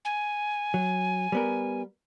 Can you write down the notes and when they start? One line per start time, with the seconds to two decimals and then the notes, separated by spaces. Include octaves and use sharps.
0.05 G#5
0.74 F#3
1.32 G3 B3 A#4